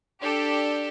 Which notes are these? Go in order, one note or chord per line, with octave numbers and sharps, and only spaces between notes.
D4 G4 A4